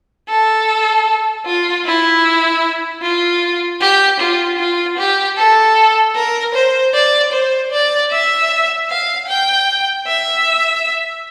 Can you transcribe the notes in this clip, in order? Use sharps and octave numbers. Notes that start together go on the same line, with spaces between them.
A4
F4
E4
F4
G4
F4
F4
G4
A4
A#4
C5
D5
C5
D5
E5
F5
G5
E5